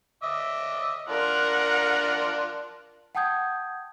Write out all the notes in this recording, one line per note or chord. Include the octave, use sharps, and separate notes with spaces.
D#5 E5 D6
D4 F4 A#4 F#5
F#5 G5 A5 D#6 G6 G#6